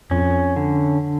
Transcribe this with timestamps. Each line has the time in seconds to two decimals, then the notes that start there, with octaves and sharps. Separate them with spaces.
0.11 F2 C#4
0.56 D3